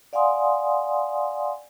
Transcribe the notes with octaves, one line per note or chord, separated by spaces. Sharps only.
D5 F5 F#5 G#5 C6 D#6